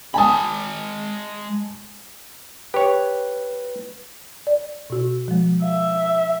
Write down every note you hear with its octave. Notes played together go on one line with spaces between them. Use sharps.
G#3 G#5 A5 B5 D#6
G4 B4 C#5
D5
B2 F#4
F3 G#3
E5 F5